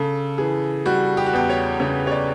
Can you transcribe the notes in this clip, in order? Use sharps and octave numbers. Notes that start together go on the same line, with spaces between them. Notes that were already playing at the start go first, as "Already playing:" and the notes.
Already playing: C#3 A4
E3 G#4
G3 F#4
G4
F#4
E2 G4
C#5
C#3 C#5
C#5
D5